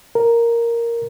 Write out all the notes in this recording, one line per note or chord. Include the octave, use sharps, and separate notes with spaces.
A#4